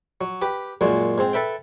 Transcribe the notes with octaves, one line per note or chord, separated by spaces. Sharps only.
F#3
G4 B4
F#2 A#2 F#3 G#3
G#2 C4
A4 B4 E5 G5